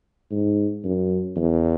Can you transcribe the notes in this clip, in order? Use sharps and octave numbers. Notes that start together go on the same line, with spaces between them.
G#2
F#2
E2